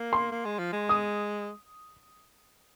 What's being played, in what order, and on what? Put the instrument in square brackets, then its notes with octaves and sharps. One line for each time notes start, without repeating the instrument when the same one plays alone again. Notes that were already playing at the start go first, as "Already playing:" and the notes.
Already playing: [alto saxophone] A#3
[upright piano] C6
[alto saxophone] A#3
G#3
F3
G#3
[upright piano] D#6